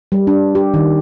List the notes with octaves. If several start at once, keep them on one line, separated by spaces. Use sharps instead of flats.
G3
D4
G4
D#3